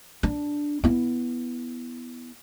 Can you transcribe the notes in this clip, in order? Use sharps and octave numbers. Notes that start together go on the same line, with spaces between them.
D4
B3 E4